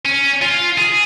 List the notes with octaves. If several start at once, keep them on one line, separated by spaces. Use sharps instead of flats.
C#4
F4
G#4